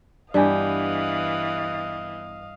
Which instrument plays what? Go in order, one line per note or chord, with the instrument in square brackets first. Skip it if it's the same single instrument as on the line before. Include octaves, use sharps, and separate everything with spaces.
[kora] G2 B3 G4 [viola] E3 [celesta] D5 G#5 [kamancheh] D#5 F5